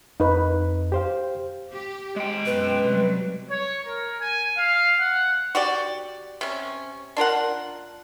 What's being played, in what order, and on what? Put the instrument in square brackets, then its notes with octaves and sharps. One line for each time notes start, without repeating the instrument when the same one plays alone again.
[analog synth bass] F2 [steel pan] D#4 B4
[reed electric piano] G4 C5 F5
[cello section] G4
[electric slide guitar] G#3 G5
[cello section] F#2 B2 [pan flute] B4
[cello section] C3 F#3 G3
[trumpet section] C#5
A#4
G#5
F5
F#5
[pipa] F#4 G4 D5
C3 C#4
D4 F4 A#4 F#5